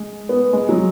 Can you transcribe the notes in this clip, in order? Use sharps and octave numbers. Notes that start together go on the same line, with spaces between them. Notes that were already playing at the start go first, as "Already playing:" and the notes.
Already playing: G#3
B3
G#3
F#3